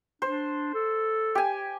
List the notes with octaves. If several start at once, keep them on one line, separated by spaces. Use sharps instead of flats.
D4 C5
A4
G4 G#5